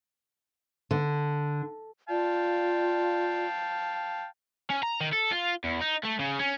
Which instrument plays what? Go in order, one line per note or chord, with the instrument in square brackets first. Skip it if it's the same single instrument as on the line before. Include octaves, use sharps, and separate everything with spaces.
[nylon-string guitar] D3
[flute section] F4 D5 [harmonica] F5 G5 A5
[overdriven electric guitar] C#4
A#5
D#3
A4
F4
E2
D#4
A3
C#3
C#4